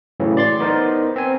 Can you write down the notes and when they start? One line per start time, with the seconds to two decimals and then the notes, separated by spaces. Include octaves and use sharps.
0.20 A2 C#3 E3 F#3
0.37 D5 C6 A6
0.60 B3 D#4 A#4 C5
1.16 C4 G#5